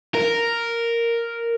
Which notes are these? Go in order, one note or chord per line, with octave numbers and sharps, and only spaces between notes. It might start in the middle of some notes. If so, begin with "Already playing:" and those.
A#4